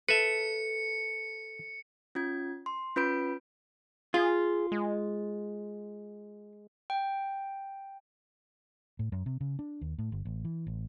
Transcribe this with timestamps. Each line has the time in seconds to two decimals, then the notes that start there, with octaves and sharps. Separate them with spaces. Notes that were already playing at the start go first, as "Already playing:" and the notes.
0.08 A4 B4 E5 C#7
2.15 C#4 F4 G#6
2.66 C6
2.96 C#4 F4 B4 B5 G6 D7
4.14 F4 G#4
4.72 G#3
6.90 G5
8.99 A2
9.12 F#2
9.26 C3
9.41 C#3
9.59 D4
9.81 D#2
9.98 A2
10.12 G1
10.25 A1
10.45 E3
10.67 A1